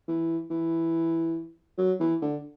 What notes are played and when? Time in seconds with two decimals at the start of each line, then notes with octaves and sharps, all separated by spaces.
0.08 E3
0.50 E3
1.78 F#3
2.00 E3
2.22 D3